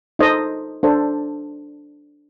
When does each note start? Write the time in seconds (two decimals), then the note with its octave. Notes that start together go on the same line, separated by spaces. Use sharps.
0.19 D#4 A4 C5 D#5
0.83 D4 A4 C5